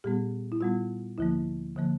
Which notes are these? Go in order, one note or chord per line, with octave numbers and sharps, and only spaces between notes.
A#2 G3 B3 G4
E4
A#2 G3 B3 F4
D2 D3 F3 A#3 E4
D3 F3 A#3